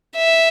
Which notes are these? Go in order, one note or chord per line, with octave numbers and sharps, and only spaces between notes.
E5